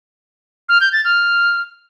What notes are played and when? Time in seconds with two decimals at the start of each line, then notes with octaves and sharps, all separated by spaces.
0.69 F6
0.81 G6
0.93 A6
1.05 F6